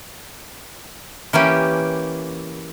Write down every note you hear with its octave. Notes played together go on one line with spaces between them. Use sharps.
E3 A#3 C#4 G4